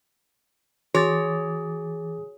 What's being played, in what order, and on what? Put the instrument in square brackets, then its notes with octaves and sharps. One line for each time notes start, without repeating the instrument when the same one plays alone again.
[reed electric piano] E3 D6 A6 [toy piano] F#4 [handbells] G#4 [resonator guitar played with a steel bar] C#5